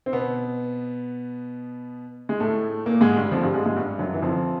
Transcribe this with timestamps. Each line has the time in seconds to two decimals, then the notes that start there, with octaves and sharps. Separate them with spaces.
0.06 C4
0.13 B2 B3
2.29 G#3
2.40 A2 A3
2.86 A#2 A#3
3.01 G#2 G#3
3.16 G2 G3
3.31 F2 F3
3.43 G2 G3
3.54 G#2 G#3
3.66 G#2 G#3
3.77 G2 G3
3.99 F#2 F#3
4.14 E3
4.22 F2 F3